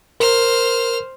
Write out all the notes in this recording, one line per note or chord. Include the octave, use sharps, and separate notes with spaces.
A#4 C5 F6